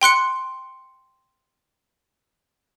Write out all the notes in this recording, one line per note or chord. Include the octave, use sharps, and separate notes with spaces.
G5 C6 F#6 C#7